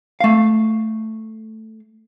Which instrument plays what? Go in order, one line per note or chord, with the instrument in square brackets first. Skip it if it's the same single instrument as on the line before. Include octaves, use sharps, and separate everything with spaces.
[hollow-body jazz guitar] A3 F5